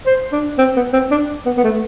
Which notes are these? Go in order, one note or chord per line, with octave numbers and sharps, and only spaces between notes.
C5
D4
C4
B3
C4
D4
B3
B3
A3